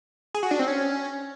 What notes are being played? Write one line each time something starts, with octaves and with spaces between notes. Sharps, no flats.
G#4
F#4
D4
C4
C#4